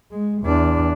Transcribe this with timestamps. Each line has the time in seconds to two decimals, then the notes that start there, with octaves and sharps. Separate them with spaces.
0.11 G#3
0.42 E2 D4